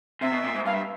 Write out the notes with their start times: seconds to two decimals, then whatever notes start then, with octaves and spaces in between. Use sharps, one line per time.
0.21 C3 E5
0.32 B2
0.44 A#2
0.55 G#2
0.65 G2 F5
0.74 E5